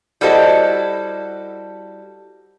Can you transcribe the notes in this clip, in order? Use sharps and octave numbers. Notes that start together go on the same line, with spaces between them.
G3 E4 F#4 A4 C5 D#5